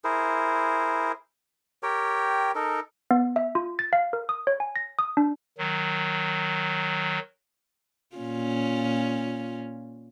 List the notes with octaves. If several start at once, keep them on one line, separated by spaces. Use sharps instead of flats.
E4 G#4 A#4 C5
G4 A#4 C#5 G5
D#4 A4 A#4
B3
E5
F4
A6
F5
A#4
D#6
C#5
G#5
A#6
D#6
D4
D#3 F#3
A#2 C#4 F4